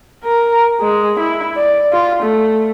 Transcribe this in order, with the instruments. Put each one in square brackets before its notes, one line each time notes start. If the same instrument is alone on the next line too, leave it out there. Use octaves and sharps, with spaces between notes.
[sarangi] A#4
G#3
E4
D5
F4
A3